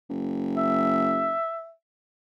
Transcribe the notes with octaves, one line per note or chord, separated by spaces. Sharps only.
F#1
E5